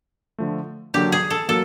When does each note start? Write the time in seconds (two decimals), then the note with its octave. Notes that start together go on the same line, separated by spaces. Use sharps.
0.38 D3 F3 A3
0.94 D3 F#3 A#3 D4 F#4 G4
1.12 G#4
1.30 A4
1.49 F#3 A#3 A4